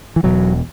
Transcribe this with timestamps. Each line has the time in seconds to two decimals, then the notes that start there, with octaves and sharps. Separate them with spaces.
0.16 E3
0.23 E1 E2 B2 F#3